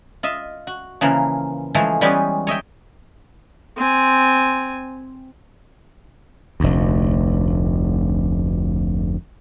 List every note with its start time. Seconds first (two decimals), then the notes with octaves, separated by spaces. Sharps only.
0.23 F4 D#5 E5
0.67 F#4
1.01 C#3 E3 F3 A#3
1.74 E3 F3 G#3 A3
2.01 E3 G3 G#3 B3 C#4 G4
2.47 C#5 D#5 E5 G5
3.77 C4 G#5
6.60 F1 D2